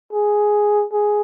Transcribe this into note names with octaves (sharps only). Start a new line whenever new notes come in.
G#4
G#4